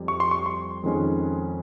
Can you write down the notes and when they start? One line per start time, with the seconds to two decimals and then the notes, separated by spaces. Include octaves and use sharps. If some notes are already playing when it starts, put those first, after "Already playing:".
Already playing: F2 G3
0.08 C#6
0.20 C6
0.31 C#6
0.46 C6
0.84 F2 D#3 G#3 C#4